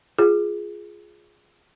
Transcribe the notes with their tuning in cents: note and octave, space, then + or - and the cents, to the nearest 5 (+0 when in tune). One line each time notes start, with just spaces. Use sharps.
F4 +0 G#4 +0